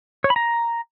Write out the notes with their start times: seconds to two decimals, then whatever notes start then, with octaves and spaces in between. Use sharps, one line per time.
0.24 C#5
0.30 B5
0.36 A#5